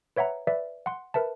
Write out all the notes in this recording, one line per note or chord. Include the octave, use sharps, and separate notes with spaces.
B4 C#5 E5 F#5 A#5
B4 D5 E5
F#5 C6
A#4 B4 E5 A5